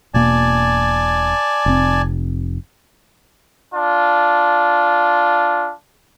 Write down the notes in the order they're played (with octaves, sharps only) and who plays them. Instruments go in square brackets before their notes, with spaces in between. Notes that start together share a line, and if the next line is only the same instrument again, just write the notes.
[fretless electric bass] E1 B2 A#3 [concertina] D5 G#5 A5
[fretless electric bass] F1 C4
[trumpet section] D4 F4